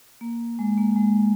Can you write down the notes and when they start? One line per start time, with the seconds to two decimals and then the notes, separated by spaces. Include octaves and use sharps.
0.21 A#3
0.59 G#3
0.77 A#3
0.96 G#3